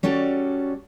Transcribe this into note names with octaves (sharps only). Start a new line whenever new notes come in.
G3 C#4 F#4 A4 D5